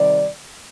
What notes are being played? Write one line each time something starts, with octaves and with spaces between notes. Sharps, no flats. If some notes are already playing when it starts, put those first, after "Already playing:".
Already playing: C3 D#3 G3 D5